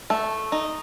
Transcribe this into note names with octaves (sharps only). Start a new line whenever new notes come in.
A3
D#4